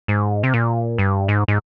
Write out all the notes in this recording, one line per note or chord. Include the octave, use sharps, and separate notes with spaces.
G#2
C3
A#2
G2
G#2
G#2